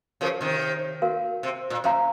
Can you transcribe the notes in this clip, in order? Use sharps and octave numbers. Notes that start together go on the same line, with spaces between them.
C#3 F3 F#4 A#4 C#5
C3 D#3
F#4 A#4 F5
C3
A#2
F#2 C5 F5 A#5